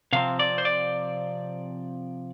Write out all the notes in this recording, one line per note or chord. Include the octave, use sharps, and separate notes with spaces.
C3 F3 C4 F5
D5
C5
D5